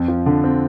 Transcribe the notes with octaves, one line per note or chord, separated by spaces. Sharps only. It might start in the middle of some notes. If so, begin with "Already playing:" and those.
Already playing: F2
F3
D3
C4